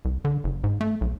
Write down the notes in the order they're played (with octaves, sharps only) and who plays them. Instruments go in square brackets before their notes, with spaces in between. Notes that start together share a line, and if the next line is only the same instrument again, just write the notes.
[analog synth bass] C2
D3
F#1
G#2
A3
B1